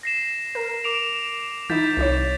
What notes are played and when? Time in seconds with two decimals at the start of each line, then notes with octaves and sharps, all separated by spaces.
0.03 A#6 C7 E7
0.55 A#4
0.84 D6 D7 F7
1.70 E3 D#4 E4 G6 A6 B6
1.97 C2 E4 C#5